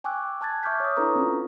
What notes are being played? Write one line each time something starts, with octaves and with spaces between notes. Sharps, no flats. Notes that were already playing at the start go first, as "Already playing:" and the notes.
G5 G#5 C#6 D6 E6 F#6
G#5 A5 F#6 G#6 A6
E5 C#6 D6 F6 G6 B6
C#5 D#6
D4 E4 A4 B4 A#5 C#6
C4 C#4 F4